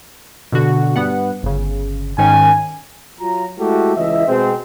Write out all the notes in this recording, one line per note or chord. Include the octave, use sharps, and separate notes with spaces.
B2 D3 F#4
G2 B3 F#5
G1 C#3
G#2 D#3 C#4 G#5
F#3 F4 A#5
G#3 A3 E4 F#4 G4 A4
C#2 E3 E4 D#5 E5
B2 G#3 C4